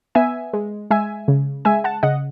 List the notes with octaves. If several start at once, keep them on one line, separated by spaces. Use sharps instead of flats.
B3 E5 G#5
G#3
G#3 E5 G#5
C#3
G#3 E5 G#5
F#5 A5
C#3 D#5 F#5